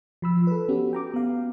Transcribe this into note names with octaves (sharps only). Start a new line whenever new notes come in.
F3 B5 E6
A4 B4
B3 C#4 F#4 G4
G5 A#5 D6
B3 F5